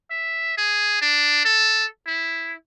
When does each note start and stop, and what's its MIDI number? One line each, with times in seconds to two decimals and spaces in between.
0.11 0.58 76
0.58 0.97 68
1.02 1.44 62
1.45 1.86 69
2.07 2.54 64